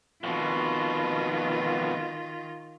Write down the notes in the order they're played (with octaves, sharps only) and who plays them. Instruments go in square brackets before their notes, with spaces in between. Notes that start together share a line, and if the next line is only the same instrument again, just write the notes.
[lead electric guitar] F2 B2 [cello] D#3 F4